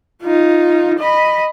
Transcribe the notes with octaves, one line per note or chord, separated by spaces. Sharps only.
D#4 F4
D#5 B5